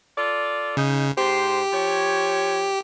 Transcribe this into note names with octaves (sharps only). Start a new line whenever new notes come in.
F4 A4 D5
C#3 D#4
G#2 G4 C5
F3 C#5